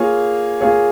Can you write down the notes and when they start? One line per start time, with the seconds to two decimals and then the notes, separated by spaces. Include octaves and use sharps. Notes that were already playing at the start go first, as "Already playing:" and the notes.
Already playing: A#3 F4 G#4 C#5
0.60 A#3 F4 G#4 C#5